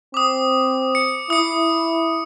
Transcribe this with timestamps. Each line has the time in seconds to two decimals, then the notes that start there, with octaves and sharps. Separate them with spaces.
0.14 C4 D6 D#6
0.95 C#7
1.30 E4 D#6 C#7